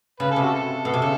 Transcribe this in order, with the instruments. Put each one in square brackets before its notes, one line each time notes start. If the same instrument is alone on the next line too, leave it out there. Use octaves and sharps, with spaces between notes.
[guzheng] C#3 [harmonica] B4
[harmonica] A4
[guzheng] C3
[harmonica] F#4 A4
[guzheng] B2 [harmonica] A4
[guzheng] C3
[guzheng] C#3 [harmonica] A4